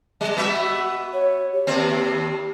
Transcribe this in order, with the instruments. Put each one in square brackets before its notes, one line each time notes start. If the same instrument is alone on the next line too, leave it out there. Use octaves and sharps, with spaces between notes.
[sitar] G3
B3 F#4 E5
[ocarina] C#5
G4
[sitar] D#2 C4